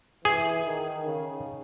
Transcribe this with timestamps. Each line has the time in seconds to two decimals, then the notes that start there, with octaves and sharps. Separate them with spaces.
0.24 E3 G#4
0.66 D#3
1.06 C#3